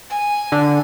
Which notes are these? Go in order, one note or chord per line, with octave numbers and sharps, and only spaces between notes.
G#5
D3